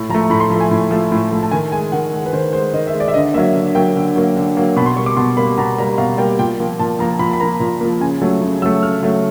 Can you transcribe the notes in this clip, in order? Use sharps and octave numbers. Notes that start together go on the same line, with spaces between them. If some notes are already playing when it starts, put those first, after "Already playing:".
Already playing: A2
F3 A3 A#5
A2 B5
C6
F3 A3
G#5
A2
F3 A3
A2
F3 A3
A5
D#3 G#5
G#3 G#5
D#3 F#5
G#3
B4
D#3 C5
G#3 C5
D#3 D#5
E5
G#3
D5
E5
D3 D#5
F#3 A#3 E5
D3
F#3 A#3 G5
D3
F#3 A#3
D3
F#3 A#3
B2 B5
C6
G3 A#3 C#6
D6
B2 C6
G3 A#3 B5
B2 A#5
G3 A#3 A#5
B2 F5
G3 A#3 G5
A#2 G5
F3 A#3
A#2 A5
F3 A#3 A#5
A#2 B5
B5
F3 A#3 A#5
A#2
F3 A#3
C#3 G#5
F#3 A3
C#3
F#3 A3 E6
C#3 F6
F#3 A3